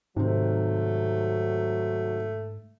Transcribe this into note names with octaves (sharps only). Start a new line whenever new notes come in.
G#2 C3 D#3 F#3 A3 C4